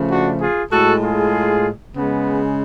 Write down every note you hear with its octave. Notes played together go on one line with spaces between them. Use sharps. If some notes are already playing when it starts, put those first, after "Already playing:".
Already playing: C#3 F3 A3
D4 F#4
F4 G#4
A2 G#3 F#4 A4
F4 G#4
C#3 G#3 B3